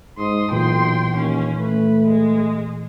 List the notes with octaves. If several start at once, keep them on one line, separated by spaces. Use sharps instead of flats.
G#2 C6 D#6
B1 A#2 E3 G5 C6
D#2 C#4
A3 B4
G#3